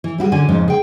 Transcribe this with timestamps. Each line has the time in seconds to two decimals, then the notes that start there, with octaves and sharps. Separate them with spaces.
0.04 E3
0.18 G3 E4 F#4 G#4
0.32 D3 C#4 D4 F#4 G#5
0.48 F2 G#2 C#3
0.68 G#4 G5